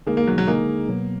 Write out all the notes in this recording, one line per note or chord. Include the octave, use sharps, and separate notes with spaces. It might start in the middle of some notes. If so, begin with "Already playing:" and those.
D3 G#3 A#3 D#4 G#4
A#3
F#3
F#3
D3 G#3 A#3 D#4 G#4
B2 F#3 B3